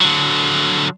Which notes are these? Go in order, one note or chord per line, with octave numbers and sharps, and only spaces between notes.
D3 F#3